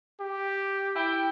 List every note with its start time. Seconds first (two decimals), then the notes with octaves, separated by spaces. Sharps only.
0.20 G4
0.95 E4 G5